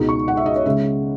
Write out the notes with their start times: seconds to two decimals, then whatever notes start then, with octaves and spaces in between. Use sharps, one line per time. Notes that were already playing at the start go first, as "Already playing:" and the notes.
Already playing: C#2 B2 G#3 D#4
0.09 C#6
0.28 F#5
0.37 E5
0.46 D#5
0.56 C#5
0.66 C#3 G#3 E5